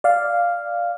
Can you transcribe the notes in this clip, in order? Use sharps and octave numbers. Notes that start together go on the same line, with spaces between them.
D5 F5